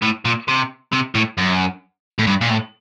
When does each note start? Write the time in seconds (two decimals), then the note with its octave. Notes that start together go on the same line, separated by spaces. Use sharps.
0.02 A2
0.25 A#2
0.48 C3
0.93 C3
1.15 A2
1.38 F#2
2.19 A2
2.27 G2
2.41 A#2
2.50 A2